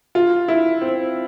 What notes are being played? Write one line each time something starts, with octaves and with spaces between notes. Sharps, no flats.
F4
E4
C4